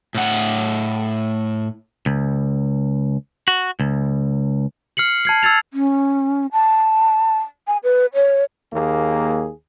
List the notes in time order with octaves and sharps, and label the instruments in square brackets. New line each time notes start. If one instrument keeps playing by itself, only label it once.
[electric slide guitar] A2 F#5
[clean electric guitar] C#2
F#4
C#2
[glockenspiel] F6 C7 C#7 F#7
A5 G#6 C7
E6 G#6 A6 F7
[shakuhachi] C#4
A5
G#5
B4
C#5
[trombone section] D#2 A#3 G#4